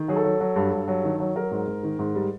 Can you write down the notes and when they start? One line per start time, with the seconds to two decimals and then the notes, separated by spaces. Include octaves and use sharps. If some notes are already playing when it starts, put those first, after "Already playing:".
Already playing: D#3
0.08 F#3 G#4
0.16 A4
0.24 F#3
0.40 F#3
0.56 G2
0.72 G2
0.88 F#3
1.04 D#3
1.20 F#3
1.36 F#3 A#4
1.51 G#2
1.67 G#2
1.83 D#3
1.99 G#2
2.15 G3